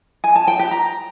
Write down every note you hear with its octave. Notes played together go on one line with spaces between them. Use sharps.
G#5
A5
G5
G4
A#5